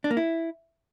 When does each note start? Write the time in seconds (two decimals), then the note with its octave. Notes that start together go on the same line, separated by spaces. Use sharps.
0.04 D4
0.11 A#3
0.17 E4